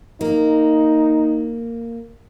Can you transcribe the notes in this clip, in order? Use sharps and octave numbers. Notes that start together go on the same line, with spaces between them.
A#3 D#4